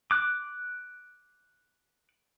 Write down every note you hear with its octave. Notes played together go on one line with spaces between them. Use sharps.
D6 F#6